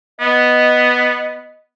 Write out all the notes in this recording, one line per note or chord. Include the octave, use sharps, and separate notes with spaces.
B3 D#5